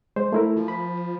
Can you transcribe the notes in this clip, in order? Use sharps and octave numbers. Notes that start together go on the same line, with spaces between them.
G#3 C5
A3 E4 A#4
F3
B5